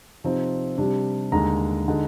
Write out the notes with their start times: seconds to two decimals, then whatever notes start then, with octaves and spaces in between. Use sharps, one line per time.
0.24 C3 F3 C4 D#4
0.78 C3 G3 D4
1.32 D#2 D3 G#3 A#5
1.88 D3 G#3 D#4